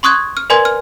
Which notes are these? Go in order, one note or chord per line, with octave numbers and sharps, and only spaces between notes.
C6 C#6 D#6 F#6 G#6
F6
A#4 B4 D5 G#5 C6 G#6
F6